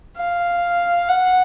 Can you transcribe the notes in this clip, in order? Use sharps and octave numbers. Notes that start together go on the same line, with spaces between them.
F5
F#5